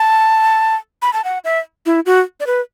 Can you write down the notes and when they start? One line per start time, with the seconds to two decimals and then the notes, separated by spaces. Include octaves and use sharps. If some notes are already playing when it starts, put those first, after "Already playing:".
Already playing: A5
1.02 B5
1.13 A5
1.24 F#5
1.44 E5
1.86 E4
2.06 F#4
2.40 D5
2.47 B4